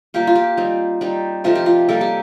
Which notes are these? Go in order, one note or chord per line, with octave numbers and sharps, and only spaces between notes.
G3 A#3 F4 G4
F4
G4
G3 C4 D#4
G3 C4 D#4
C3 F3 A3 D#4 F4
G4
F4
C3 G3 A#3 F4 A4
G4